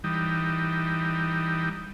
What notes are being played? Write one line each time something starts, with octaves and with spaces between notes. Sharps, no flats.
E3 G3 D#4